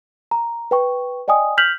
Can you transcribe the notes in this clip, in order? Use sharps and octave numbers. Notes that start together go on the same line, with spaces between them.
A#5
B4 G5 C#6
D5 D#5 G5 G#5 D#6
F6 G6 B6 F7 F#7